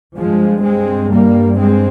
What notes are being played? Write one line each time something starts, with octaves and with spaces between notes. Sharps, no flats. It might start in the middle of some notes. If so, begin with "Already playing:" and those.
G2 F3 G#3
G#3 C4
G3 A#3
G#3 C4